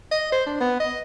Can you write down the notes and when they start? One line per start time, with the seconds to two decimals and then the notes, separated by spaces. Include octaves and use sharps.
0.11 D#5
0.32 C5
0.47 D4
0.60 B3
0.80 D#5